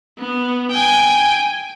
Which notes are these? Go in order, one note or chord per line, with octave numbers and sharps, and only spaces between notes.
B3
G5 G#5